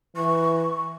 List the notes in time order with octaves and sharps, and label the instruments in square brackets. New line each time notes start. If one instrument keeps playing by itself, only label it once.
[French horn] E3 [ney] C#6